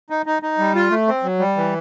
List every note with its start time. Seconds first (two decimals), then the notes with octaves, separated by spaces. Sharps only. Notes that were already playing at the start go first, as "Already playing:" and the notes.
0.10 D#4
0.26 D#4
0.43 D#4
0.58 G3
0.75 F4
0.91 A3
1.07 C4
1.24 F#3
1.39 G3
1.56 E3